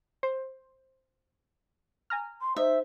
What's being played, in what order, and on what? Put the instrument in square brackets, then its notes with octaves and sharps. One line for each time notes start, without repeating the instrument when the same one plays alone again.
[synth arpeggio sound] C5
G#5 A#5 F6
[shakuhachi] C6
[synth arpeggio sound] D#4 [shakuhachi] C5 [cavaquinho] E5